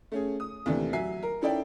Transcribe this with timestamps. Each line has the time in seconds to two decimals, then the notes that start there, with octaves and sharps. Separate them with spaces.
0.12 A3 C#4 G#4
0.40 D#6
0.66 D#2 C3 E3 A3 D4
0.93 F#3 E5 G#5 C7
1.23 A#4
1.41 C#4 D#4 E4 A4 D5 G5